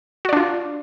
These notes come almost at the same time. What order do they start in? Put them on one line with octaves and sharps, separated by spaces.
F#4 D5 D4 F4